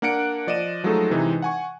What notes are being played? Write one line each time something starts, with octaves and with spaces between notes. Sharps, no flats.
A#3 D4 F#5 F#6 C#7 D7
F3 D5 D#5 D#7 E7
F3 F#3 G#3 A3 D#4 A4
C3 E3 G#3 D#4
F#5 G#5 C#6